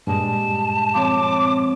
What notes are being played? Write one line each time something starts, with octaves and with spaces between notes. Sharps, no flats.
G2 A#2 G3 G#3 A5
F3 C4 C#5 D6